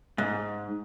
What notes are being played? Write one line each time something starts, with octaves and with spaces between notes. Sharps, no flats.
G#2